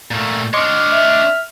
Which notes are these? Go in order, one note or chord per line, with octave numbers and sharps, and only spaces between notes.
A#2 A3 F5
D4 C#5 D#5 C6 D6 F6
E5